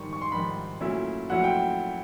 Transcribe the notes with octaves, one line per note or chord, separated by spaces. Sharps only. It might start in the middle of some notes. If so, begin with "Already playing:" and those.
Already playing: G#2 D#3 G3 C#6
C#6
C6
G#2 D#3 G3 B5
A#2 F#3 A3 C#4 E4
A#2 F#3 A3 C#4 E4 F#5
G5